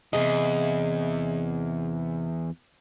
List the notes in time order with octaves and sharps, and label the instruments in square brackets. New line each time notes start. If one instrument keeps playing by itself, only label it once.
[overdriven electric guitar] E2 G2 [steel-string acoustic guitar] C3 G#4 D#5